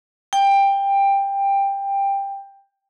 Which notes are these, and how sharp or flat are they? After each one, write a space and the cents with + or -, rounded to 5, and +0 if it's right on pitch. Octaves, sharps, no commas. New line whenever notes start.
G5 +15